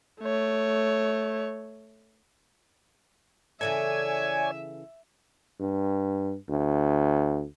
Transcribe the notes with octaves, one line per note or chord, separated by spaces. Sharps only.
A3 C#5
C#3 E3 A4 C#5 D5 E5 G#5 G#6
G2
D2